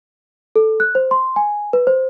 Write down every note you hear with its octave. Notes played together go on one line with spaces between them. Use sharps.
A4
F#6
C5
C6
G#5
B4
C5